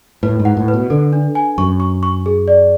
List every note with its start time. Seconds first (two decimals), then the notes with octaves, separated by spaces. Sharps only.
0.23 A2 B4
0.39 G#2
0.45 F#5
0.57 A2
0.68 B4
0.74 B2
0.90 D3 A4
1.13 D4
1.35 G#5
1.58 F#2 C#6
1.80 C#6
2.03 C#6
2.26 G#4
2.48 D5